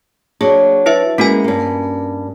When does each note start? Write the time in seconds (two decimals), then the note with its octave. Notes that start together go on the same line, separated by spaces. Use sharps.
0.41 F#3 A#3 D4 G#4
0.86 E4 B4 E5
1.18 G#3 A#3 C#4 E4 F#4 G#5
1.44 G2 A#3